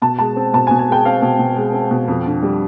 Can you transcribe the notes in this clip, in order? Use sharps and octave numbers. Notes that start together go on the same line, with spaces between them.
B2 A5
G#3 A5
C4
B2 A5
G#5
B2
G#5
G#3 G5
C4 F5
B2
B2
G#3
C4
B2
F2
D3
G3